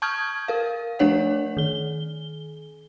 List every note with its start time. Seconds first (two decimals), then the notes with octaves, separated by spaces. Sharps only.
0.02 A5 C#6 D#6 F6 G6 G#6
0.48 A#4 F5
0.99 F3 A3 D4 C#5 F#5
1.57 D#3 G7